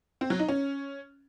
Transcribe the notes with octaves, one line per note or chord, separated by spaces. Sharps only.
C4
F#3
D#4
C#4